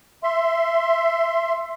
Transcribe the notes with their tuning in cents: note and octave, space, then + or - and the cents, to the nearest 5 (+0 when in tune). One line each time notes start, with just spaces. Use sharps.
E5 +15 C6 +0